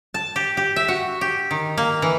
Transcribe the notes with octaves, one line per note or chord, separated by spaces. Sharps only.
A5
G4
G4
E5
F#4
G4
D#3
A#3
E3